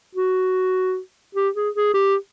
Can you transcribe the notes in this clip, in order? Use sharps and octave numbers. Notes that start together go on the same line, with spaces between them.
F#4
G4
G#4
G#4
G4